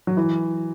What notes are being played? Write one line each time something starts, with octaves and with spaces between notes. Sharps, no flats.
F#3
E3